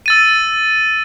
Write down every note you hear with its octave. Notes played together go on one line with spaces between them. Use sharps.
E6 A6 D#7